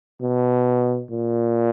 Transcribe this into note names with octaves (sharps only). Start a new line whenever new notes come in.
B2
A#2